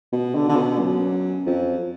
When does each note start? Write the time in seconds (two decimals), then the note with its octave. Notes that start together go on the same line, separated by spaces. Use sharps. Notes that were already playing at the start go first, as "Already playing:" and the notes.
0.13 B2
0.35 D3
0.49 D3
0.57 B2
0.79 F#2
1.46 F2